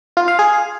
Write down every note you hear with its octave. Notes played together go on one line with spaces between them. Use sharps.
F4
F5
G#4